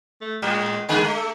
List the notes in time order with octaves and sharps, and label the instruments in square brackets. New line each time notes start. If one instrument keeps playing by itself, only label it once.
[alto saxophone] A3
[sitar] A2 [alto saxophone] G#3
[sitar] D3 A#3 G#4 [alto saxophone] G#3
[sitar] A3
[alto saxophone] A4